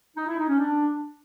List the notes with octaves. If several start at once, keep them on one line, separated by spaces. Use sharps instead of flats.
D#4
E4
D#4
C#4
D4